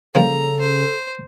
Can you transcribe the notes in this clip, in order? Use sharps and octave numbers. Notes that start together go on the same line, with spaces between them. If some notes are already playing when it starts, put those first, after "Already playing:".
C#3 F3 G3 A#3 A4 A#5
C5